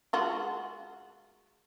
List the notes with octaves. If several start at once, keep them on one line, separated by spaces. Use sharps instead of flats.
G#3 F4 F#4